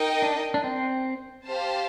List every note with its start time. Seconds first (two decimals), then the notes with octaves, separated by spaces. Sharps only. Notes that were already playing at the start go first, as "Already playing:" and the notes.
Already playing: D#4 A#4 D#5 G5
0.22 D4
0.54 D4
0.64 C4
1.47 G4 C5 F5 A5